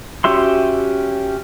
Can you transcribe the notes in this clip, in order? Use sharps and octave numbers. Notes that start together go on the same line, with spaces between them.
C#4 F#4 G4 E5 C6